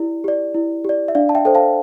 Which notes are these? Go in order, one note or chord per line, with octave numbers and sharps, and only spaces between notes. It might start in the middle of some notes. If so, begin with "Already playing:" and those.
Already playing: E4 G4 D5
G4 D5
E4
G4 D5
E5
D4 D5 F5
A5
E5 G5
A4 C5 G5
F5 A5